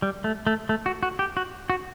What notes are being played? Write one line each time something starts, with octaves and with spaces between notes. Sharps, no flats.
G3
A3
A3
A3
F#4
F#4
G4
F#4
F#4